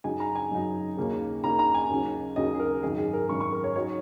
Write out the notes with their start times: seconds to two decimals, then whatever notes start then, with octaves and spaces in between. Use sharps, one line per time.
0.04 F#2 C#3 F#3 D#4 G#5
0.20 A#5
0.35 G#5
0.51 F#2 C#3 F#3 D#4
0.97 D#2 C#3 A#3 C#4
1.44 D#2 C#3 A#3 C#4 A#5
1.59 A#5
1.74 G#5
1.90 D#2 C#3 F#3 C#4
2.36 D#2 C#3 F#3 C#4 D#5
2.55 G#4
2.59 A#4
2.83 G#1 F#2 C#3 G#4
2.98 G#4
3.13 A#4
3.29 G#1 F#2 C#3 C#6
3.40 C#6
3.52 A#4
3.64 C#5
3.75 F#3 D#4 C#5